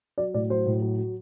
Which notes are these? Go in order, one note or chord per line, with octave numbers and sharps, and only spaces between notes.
F#3 D5
A2 D5
F#3 C5
A2
F#3
F#3